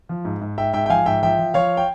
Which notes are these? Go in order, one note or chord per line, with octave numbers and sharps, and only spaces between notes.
F3
G#2
G#2
G#2 E5 G5
G#2 E5 G5
G5
F3 F5 G#5
G#2 E5 G5
F3 E5 G5
F3
F3 C#5 F5
G5